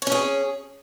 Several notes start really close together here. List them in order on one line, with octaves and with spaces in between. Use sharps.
C#5 C#4 G#4